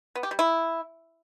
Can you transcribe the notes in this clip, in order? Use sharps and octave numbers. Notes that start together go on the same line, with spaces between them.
B3
G4
G3
E4